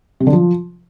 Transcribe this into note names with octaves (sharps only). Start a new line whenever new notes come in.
C3
D3
F3